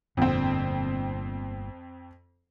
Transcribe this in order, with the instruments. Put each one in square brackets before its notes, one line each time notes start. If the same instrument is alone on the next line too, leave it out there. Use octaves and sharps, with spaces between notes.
[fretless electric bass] G1 A#2 D3 [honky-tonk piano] F2 C4